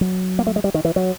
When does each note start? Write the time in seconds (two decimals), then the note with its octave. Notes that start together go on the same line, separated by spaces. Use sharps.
0.01 F#3
0.39 A#3
0.47 A3
0.56 G#3
0.64 G3
0.74 D#3
0.85 E3
0.96 F#3